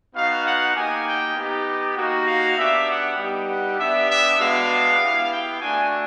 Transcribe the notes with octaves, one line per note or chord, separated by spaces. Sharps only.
B3 D#4 F#4 F5
F#5
A#3 D#4 G4 G#5
G5
B3 D#4 G4
A#3 D#4 F#4
F5
B3 D4 G4 E5
F#5
G3 B3 D#4 G4
F#5
B3 D4 G4 E5
E5
G#3 B3 D4 F#4 F5
B3 E4 G4
G5
A3 D4 F#4 G#5